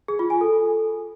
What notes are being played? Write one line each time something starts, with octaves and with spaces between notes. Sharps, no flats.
G#4
F4
G#5
A4